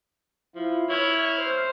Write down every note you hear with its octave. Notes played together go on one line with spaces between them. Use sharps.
F3 E4 F4
E4 C#5 F6
C5